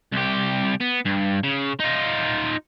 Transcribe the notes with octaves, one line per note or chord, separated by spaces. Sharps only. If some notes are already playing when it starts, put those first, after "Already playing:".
C2 G4
B3
G2
C#3
D#4 F4